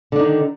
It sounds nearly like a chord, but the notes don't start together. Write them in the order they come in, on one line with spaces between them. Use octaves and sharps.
D3 D4 D#4 D#3